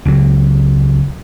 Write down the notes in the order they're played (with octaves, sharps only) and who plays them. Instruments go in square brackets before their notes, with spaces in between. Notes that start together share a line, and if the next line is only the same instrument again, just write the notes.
[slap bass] C#2 F#3